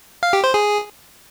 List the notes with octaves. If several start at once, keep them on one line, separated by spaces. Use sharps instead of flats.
F5
G4
C5
G#4